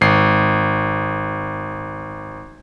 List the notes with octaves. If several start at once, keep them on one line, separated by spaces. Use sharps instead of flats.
G#1 C7